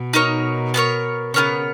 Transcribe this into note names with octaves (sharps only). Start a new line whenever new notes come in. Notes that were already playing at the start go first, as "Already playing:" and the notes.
Already playing: B2
D#4 A#4 C#5
B3 E4 A#4 C#5
C#3 B3 E4 A#4 C#5